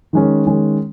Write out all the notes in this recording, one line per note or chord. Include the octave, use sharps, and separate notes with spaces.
D#3 G#3 C#4
D#3 G#3 C#4